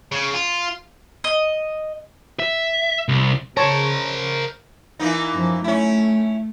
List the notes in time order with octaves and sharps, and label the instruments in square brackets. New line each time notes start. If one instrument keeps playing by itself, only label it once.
[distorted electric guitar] C#3
F4
[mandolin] D#5
[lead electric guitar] E5
C2
[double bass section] C#3 [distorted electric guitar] A#4 C5 [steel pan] C#5 A5
[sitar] E3 A#3 D#4
[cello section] F#2 F3
[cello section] A3 [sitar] C#4 E4